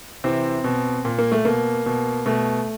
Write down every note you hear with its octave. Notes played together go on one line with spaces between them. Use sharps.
C3 E3 C4
B2
A#2
A#3
A3
B2 A#3
B2
B2 A3